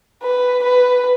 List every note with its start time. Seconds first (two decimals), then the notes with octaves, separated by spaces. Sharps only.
0.23 B4
0.64 B4